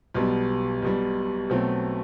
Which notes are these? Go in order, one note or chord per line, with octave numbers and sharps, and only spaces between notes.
B1 B2 G3
B1 B2 G3
B1 B2 F#3 A3 C4